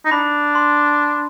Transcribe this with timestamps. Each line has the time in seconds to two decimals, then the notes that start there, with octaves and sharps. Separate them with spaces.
0.05 D#4
0.11 D4 B5
0.55 C6